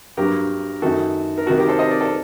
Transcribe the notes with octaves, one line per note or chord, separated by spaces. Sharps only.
G2 F#3 A#3 G4 A#4
F#2 D#3 A3 F#4 A4
A#4
C3 D#3 A3 F#4 A4
G4 A#4
A4 C5
C5 D#5
A#4 D5
A4 C5